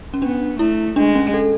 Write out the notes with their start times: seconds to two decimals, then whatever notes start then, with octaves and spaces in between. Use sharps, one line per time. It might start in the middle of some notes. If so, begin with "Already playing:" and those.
0.14 C#4
0.22 B3 D4
0.59 A3 E4
0.96 G#3 D4
1.15 C#4
1.34 A4